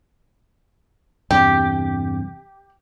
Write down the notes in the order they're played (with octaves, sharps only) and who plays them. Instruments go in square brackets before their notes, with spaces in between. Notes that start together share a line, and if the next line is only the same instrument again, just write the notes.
[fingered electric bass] E2 G2 C3 [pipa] G4